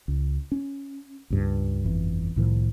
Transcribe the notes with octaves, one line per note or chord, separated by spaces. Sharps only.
C#2
C#4
C#2 G2
G1 F2 E3
C2 A2 D#3 F3